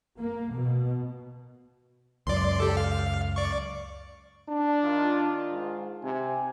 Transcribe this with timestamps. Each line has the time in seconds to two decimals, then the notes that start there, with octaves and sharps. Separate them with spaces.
0.20 A#3
0.55 B2
2.27 C#2 F#2 D5 C6
2.60 G4 A4
2.77 F5
3.36 D5 C#6
4.49 D4
4.84 D#3 F4
5.52 G#2
6.03 C3 G#5